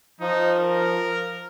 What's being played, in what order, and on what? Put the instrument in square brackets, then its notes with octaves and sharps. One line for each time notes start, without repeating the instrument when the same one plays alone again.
[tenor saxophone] F3 [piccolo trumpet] D#4
[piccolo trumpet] A#4